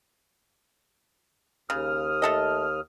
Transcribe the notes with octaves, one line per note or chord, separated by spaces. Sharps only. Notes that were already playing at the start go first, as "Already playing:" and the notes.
D#2 C#3 D#6 F6
A3 A4 D#5